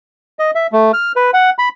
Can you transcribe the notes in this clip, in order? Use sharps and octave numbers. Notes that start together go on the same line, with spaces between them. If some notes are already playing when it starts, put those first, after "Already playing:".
D#5
E5
A3
F6
B4
F#5
B5